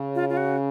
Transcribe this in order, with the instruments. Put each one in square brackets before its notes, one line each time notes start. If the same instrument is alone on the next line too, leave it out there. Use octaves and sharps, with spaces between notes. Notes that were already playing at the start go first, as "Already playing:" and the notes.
Already playing: [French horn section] C#3
[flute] F4
F4
F#4